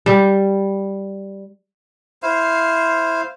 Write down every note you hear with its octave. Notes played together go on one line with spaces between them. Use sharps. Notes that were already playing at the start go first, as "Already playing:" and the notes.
G3
E4 C5 F5